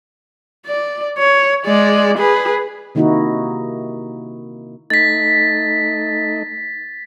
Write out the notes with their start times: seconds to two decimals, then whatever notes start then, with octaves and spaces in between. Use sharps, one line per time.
0.66 D5
1.18 C#5
1.65 G#3 D5
2.18 G#4 B4
2.95 C3 D#3 A#3 D#4 E4 F#4
4.90 A3 D#4 A6 B6